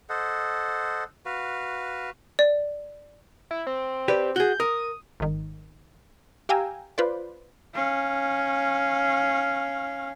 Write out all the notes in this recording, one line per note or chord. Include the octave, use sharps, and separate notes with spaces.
A4 C5 D#5 F#5
F#4 B4 F5
D5
E4
C4
G4 B4 D5
F#4 G#4 G6
A#4 D#6
G#1 D#3
G4 F5 G5 G#5 A#5 E6
F4 B4 C5 D5
C#4 F5